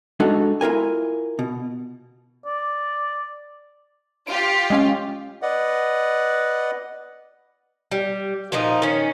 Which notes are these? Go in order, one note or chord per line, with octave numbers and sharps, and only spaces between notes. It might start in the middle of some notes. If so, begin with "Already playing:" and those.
G#3 D4 D#4 F#4 A4
E4 F4 A#4 G#5
B2
D5
F4 G4 D7
G#3 C#4 F5
B4 D5 D#5 F#5
G3
A#2 F3 A#3 D#4
D#3 C#4